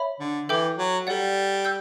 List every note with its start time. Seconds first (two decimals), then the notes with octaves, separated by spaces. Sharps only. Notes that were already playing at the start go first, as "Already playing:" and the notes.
Already playing: C#5 E5 B5
0.20 D3
0.48 E3 A4 E5 G5 D6 G6
0.78 F#3
1.07 G3 A4 D5 F#5
1.65 E6 G6